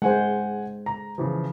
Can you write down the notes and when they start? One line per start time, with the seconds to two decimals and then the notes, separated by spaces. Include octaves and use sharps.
0.02 G#3 C5 F#5 G#5
0.86 A#5
1.18 C#3 E3 F3